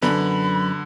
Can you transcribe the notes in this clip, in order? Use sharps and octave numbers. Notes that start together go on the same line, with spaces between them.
F#2 D3 B3 B5